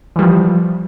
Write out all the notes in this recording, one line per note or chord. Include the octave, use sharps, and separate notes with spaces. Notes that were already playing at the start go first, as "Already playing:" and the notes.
E3 F3 G3